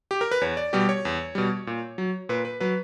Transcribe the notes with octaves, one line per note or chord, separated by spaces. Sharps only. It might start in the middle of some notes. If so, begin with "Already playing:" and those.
G4
A#4
B4
E2 C#5
D5
B2 G3 G4
C#5
E2
B2 G3
A#2
F#3
A#2 B4
B4
F#3 B4